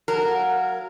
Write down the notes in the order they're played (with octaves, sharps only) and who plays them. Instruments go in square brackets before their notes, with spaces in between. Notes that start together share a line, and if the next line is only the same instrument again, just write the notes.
[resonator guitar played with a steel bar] F#3 A#4
[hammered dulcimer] F5 F#5